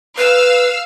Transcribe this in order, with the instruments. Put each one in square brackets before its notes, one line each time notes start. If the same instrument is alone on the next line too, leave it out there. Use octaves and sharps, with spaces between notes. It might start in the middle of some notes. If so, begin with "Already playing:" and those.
[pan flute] B4 [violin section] F5 E6